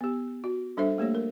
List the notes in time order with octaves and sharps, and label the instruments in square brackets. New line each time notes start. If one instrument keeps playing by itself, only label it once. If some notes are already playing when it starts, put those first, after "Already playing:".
[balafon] B3 G4
F#4
G3 D4 A4 C5 E5
A3 A#3 G4 C#5
A#4